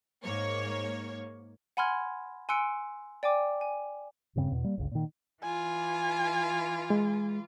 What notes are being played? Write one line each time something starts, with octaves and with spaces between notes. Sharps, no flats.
G#2 A#3 C#5
F#5 G#5 B5 C6 F6 G#6
G#5 C6 E6 F#6 C#7 D7
D5 G5 G#5 D6
G#5
D#1 G2 C#3 C4
E2 B2
G3 A#3
G1 C#2
A#2 D#3
E3 F4 G#5
G#3